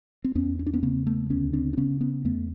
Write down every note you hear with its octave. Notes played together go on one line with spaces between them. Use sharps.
C4
E2 B3 C#4
C#4
D4
B3 C#4
C#3 A#3 C4
A3 B3
D2 B3 C#4
C4 D4
D4
C#3 B3 C#4
B3 C#4
E2 A3 B3